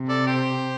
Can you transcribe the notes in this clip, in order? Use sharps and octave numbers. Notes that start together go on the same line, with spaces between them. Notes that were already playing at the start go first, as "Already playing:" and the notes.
Already playing: C3
A4 D5
G4 C5